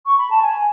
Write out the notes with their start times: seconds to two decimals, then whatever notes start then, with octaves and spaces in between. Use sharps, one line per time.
0.06 C#6
0.18 B5
0.30 A5
0.42 G#5